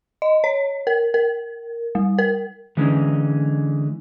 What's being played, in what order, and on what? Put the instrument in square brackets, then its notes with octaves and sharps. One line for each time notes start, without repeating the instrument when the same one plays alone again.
[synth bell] D#5
C#5
A#4
A#4
G3
A#4
[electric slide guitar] D3 E3 G#3 C#4 D#4